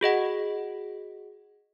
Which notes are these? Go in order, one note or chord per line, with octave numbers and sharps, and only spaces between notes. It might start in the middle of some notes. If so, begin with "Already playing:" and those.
F#4 G#4 D#5 F#5